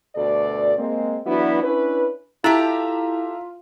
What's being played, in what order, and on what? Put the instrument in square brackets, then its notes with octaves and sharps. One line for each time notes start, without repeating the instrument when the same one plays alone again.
[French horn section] D2 B2 A4 D5
G#3 A#3 C4
E3 F#3 B3 D4 E4 F#4
C#4 D4 E4 B4
[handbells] E4 [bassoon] F4 [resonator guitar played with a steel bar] G4 A4 [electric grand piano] E5 A#5